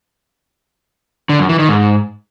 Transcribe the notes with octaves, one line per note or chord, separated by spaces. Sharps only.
D3
F#2
E3
D#3
G#2